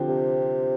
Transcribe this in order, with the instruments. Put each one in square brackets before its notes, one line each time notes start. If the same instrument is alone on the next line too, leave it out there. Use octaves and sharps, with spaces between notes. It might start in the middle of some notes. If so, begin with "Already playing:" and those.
Already playing: [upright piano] D3 F3 C4 G4
[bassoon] C3